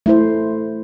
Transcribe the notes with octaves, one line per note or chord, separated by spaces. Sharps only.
A3 E4 C5